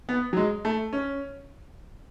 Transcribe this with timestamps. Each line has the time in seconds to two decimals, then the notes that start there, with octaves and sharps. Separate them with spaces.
0.09 B3
0.33 F#3
0.37 G#3
0.65 A3
0.93 C#4